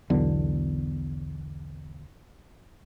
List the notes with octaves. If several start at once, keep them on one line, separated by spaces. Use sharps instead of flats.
B1 E2 D3